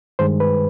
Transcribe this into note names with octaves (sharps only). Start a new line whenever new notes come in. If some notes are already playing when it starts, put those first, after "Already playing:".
G2 D#3 G#3 C5
B4